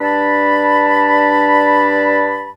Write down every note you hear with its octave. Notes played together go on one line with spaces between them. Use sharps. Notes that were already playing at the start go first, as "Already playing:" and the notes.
G2 D4 D5 A5 B5